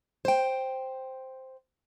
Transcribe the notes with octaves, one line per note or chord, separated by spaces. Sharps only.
C5 G5